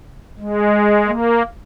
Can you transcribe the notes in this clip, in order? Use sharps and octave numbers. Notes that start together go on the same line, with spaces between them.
G#3
A#3